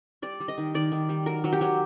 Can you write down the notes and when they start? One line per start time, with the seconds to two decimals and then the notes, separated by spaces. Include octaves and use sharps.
0.22 G3 D5
0.40 G3
0.48 D#5
0.58 D#3
0.74 D#3 D5
0.92 D#3
1.09 G3
1.26 F#3 A#4
1.44 F#3
1.52 G4
1.61 F#3